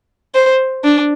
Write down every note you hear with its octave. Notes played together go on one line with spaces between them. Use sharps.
C5
D4